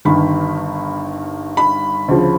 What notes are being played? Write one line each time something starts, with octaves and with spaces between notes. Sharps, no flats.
G1 G2 D#3 B5
B5
D2 C#3 F3